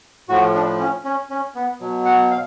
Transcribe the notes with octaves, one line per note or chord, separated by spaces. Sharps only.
A2 F3 F#4
D4
C#4
C#4
C#4
B3
B2 F#3
F#5
F5